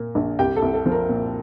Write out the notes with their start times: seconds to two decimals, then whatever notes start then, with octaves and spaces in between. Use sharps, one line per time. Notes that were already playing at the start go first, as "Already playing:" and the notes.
Already playing: A#2 A#3
0.15 A#1
0.39 C2 G4 G5
0.56 A4
0.62 C2
0.74 A4
0.86 F3
0.92 A#4
1.09 A#2